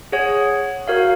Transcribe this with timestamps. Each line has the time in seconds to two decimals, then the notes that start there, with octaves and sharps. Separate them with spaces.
0.12 G#4 C#5 F#5
0.88 F#4 A#4 C#5 F5